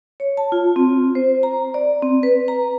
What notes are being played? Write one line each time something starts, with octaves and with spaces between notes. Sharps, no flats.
C#5
A5
F4
C4
C5
A#5
D5
C4
B4
A#5